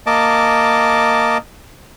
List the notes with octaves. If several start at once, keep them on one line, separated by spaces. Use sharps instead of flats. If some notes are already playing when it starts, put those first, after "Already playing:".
A#3 D#5 A5 D6